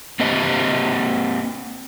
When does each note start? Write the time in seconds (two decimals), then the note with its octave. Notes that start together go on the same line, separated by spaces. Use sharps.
0.20 A#3 C4 G4 D#5